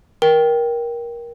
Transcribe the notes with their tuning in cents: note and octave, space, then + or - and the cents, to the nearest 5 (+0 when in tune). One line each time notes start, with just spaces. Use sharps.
A#4 +20 G5 +0